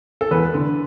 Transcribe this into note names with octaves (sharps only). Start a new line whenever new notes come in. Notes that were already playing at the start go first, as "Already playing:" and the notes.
A4
E2 B4
D3